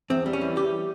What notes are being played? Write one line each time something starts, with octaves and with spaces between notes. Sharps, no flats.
E2 C4
G3
C#4
E3
E2 G4